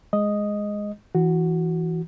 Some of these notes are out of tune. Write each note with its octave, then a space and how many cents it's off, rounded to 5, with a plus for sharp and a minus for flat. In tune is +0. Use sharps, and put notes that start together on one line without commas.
G#3 +0 D#5 +0
E3 +0 F#4 +0